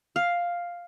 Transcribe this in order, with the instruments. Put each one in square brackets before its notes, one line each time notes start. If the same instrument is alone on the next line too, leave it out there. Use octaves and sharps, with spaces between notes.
[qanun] F5